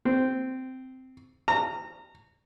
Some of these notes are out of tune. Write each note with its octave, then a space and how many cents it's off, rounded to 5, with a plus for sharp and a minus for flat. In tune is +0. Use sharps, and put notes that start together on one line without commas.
C4 -10
A#5 -25